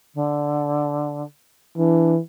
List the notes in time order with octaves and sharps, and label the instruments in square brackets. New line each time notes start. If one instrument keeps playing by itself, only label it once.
[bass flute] D3
[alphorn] E3 [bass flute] D4